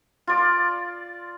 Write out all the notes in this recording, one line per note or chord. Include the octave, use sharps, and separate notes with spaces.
F4 D5